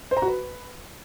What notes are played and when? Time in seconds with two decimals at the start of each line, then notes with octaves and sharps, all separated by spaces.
0.11 C5
0.17 A#5
0.22 F#4
0.27 B4